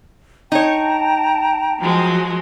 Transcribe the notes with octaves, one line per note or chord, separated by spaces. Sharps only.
D#4 C#5 G5 A5 A#5
F3 F#3 G#3